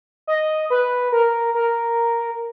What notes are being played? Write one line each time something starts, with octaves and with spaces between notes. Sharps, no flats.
D#5
B4
A#4
A#4